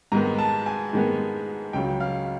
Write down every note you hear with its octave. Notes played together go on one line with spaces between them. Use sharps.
G#2 D#3 G#3 B3 A#5
A5
G#5
G#2 D#3 G#3 B3
C#2 C#3 F#3 G5
F5